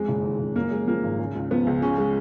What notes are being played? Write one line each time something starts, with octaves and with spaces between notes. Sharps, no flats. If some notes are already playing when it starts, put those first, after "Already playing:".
Already playing: F2 G#3
F#1
D#3
F#1
F#2 A#3
G#3
F3 A#3
G#1
C#3
C#2
F3 B3
C#2
C#3 C#4
G#3